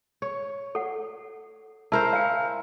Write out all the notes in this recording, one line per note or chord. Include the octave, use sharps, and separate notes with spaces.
C#5
A4 F#5
E4 A#4 C5 A5
F5 G#5